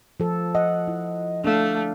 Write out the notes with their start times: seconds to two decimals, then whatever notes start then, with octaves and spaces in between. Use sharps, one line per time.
0.20 F3 A4
0.55 D#5 F#5
0.88 E4
1.44 A3 D4 F5